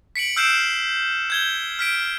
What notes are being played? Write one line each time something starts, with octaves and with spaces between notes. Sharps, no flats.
B6 C#7 D7 F#7
E6 F6 G6 C7 D7 E7
G6 G#6 G7
F6 B6 D7